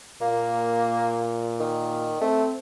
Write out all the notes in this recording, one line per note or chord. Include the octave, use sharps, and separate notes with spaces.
A#2 A#3
D#3
A3 C4